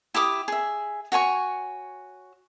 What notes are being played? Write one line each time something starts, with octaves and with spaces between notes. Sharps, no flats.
E4 G4 D6 D#6
G#4 E5
F#4 C#5 G#5 C#6